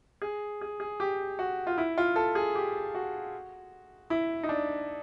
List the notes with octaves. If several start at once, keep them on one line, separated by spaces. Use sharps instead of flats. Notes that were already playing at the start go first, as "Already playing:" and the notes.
G#4
G#4
G#4
G4
F#4
F4
E4
F4
A4
G#4
G4
F#4
E4
D#4
D4